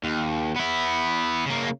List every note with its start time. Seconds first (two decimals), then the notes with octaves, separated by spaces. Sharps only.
0.04 D#2
0.56 B3 E4
1.46 C#3 A#3